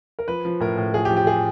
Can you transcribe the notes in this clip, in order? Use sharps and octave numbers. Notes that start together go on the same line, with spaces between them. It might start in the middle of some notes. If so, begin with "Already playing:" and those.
A#4
F3 B4
F3
A2 A#4
A2
F3 G#4
G4
F3
G4
G#4